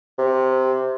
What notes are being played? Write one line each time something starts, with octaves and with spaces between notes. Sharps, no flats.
C3